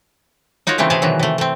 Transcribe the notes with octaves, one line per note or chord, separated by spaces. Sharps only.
D#4 F4 F#4 A#4 C#5
C#3 E3 A3 C4
C3 A3 G#4 F5 A5
B2 D#3 E3 F#3
C3 A3
A3 C4